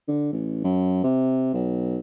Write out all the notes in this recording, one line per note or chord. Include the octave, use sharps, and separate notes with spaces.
D3
A1
F#2
C3
B1